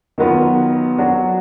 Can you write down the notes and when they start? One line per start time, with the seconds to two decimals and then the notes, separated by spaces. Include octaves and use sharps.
0.18 D#3 F#3 B3 F4
0.98 F#3 D4 F#4